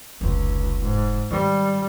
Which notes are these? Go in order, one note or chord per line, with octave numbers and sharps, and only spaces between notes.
F1 C#2 D#4
G#2
D#3 G3